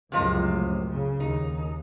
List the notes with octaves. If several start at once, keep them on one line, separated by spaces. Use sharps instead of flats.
C#2 F#2 A2 C3 F3 D#5
C#3
D#2 D#4